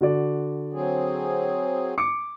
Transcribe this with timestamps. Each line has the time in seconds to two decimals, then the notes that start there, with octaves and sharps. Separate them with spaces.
0.01 D3 F#4 D5
0.73 F#3 C4 G#4
1.98 D6 C#7